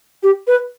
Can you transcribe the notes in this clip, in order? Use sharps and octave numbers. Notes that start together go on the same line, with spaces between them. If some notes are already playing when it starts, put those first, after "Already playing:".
G4
B4